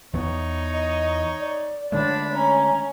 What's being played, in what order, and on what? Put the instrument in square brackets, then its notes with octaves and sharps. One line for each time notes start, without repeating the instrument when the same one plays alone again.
[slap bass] E2 E3 B3 [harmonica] D#4 C#5
[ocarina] D#5
D5
[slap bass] D3 G#3 A3 [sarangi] D4 [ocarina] C#5 [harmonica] B5
[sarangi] C#4 [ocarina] A#5